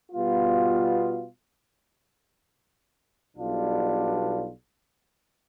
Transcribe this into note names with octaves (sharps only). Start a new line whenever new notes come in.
B2 G3 B3 F4
B1 B2 G3 D4 F4